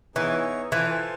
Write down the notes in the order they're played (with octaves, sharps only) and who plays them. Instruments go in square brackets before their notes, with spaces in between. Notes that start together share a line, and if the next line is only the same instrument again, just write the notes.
[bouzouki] E3 [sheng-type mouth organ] B3 D#4 G#4 C#5 E5
[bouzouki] E3 [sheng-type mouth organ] F4 A4 C5 F5 G#5